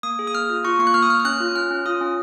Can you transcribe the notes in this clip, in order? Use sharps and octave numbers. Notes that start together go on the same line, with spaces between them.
A#3 D#6
G#4
D#6
A#3 F6
F4
F4 C#6
A#3 C#6
F#6
A#3 F6
D#6
A#3 F6
F6
C#4 F#6
F4
C#4 F6
C#4
F4 D#6
C#4